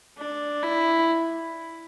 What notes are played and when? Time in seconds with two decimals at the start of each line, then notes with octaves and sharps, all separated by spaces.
0.18 D4
0.63 E4